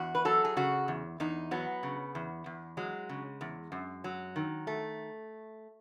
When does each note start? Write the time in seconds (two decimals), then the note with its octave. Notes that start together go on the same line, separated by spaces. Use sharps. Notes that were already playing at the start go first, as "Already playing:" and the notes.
Already playing: E2 F#4
0.15 B4
0.25 F#3 A4
0.45 G#4
0.57 C#3 F#4
0.88 E2
1.20 E2 D#4
1.51 F#3 B3
1.83 C#3
2.15 E2
2.46 E2
2.77 F#3 G#3
3.09 C#3
3.41 E2
3.72 F#2
4.04 F#3
4.36 D#3
4.67 A3